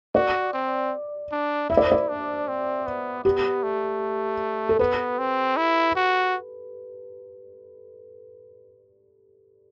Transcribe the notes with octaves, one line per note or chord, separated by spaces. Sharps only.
F#4 D5
C4
D4
E4 E5
D5
C5
D5
D4
C4
B3
B3 G4
A3
A4
B3 B4
C4
E4
F#4